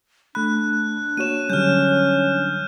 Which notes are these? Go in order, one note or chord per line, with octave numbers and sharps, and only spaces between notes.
A3 D4 B5 F#6
A#3 F#4 C#5 D#7 E7
D3 F#3 G3 C#4 F6 G6